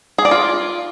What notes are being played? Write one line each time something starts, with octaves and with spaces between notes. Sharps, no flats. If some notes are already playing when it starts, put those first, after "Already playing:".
G#4
D5
F4